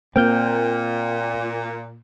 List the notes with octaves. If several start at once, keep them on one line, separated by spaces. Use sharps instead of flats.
A#2 A#3 C4 G5 F6 G6